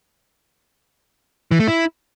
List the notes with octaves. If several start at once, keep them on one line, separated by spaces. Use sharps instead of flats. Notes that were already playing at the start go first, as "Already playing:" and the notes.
E3
A3
E4